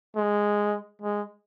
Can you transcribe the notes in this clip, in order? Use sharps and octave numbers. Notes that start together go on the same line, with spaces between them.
G#3
G#3